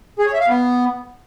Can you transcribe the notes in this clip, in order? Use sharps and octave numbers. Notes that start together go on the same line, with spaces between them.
G#4
C#5
E5
F5
B3